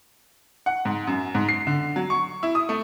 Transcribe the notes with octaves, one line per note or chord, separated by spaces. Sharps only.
F#5
G#2
F#2
G#2
C7
D3
F#3
C#6
E4
D#6
A3